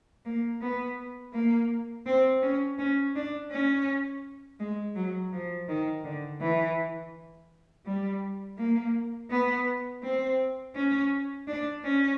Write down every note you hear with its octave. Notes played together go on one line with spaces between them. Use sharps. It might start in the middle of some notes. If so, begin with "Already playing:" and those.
A#3
B3
A#3
C4
C#4
C#4
D4
C#4
G#3
F#3
F3
D#3
D3
E3
G3
A#3
B3
C4
C#4
D4
C#4